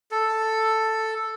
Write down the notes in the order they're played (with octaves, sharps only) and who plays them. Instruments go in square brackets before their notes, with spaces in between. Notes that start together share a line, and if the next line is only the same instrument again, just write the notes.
[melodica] A4